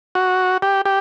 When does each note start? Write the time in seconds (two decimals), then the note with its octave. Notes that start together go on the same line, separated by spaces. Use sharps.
0.15 F#4
0.62 G4
0.85 G4